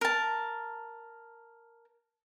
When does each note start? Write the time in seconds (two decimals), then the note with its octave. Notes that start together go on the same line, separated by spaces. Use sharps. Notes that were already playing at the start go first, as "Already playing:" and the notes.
0.01 A#4 A5